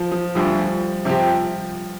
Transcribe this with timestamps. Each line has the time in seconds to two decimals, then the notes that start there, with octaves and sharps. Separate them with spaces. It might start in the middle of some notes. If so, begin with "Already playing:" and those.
Already playing: F3
0.12 F3
0.35 D2 D3 F3 G3
1.05 C3 F3 C4 G4